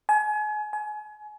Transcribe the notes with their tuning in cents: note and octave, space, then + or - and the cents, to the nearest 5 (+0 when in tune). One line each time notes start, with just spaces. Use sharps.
G#5 +35
G#5 +30